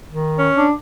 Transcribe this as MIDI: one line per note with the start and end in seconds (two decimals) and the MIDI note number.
0.12 0.49 51
0.38 0.65 61
0.56 0.72 62